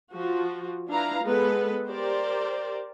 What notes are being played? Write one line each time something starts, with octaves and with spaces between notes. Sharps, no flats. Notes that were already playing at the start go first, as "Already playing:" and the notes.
F3 F4 F#4
D4 E4 B4 F5 A#5
G#3 B3 A4 B4
G4 A#4 C5 D5